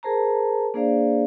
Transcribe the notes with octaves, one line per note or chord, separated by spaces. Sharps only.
G#4 A#4 C5 A5 A#5
A#3 D4 G#4 C5 D5 F5